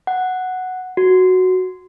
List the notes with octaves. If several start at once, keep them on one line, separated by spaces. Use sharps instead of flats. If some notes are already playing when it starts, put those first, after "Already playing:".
F#5
F#4